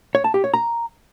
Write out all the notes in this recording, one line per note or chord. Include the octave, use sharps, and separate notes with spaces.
C#5
A5
G4
C#5
A#5